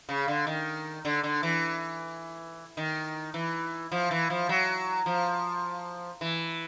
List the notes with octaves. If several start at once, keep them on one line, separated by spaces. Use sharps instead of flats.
C#3
D3
D#3
D3
D3
E3
D#3
E3
F3
E3
F3
F#3
F3
E3